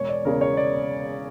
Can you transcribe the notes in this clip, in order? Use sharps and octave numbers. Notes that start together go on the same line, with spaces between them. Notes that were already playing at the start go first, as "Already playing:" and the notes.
Already playing: E1 C#5
D5
E2 C#3 A#4
C#5
D5